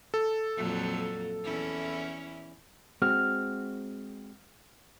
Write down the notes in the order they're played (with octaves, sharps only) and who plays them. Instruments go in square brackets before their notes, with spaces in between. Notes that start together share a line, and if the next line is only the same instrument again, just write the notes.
[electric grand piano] A4
[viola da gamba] F2 A#2 F#3
E2 C#4 E4
[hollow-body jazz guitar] G#3 C4 F#4 [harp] F6